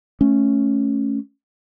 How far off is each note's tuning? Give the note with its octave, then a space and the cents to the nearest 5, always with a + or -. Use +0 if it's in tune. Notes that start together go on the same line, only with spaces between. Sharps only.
A3 +0 C#4 +0